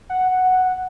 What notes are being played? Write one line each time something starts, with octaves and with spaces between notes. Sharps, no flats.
F#5